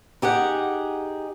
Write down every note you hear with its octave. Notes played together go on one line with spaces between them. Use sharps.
D#4 G4 G#4 F#5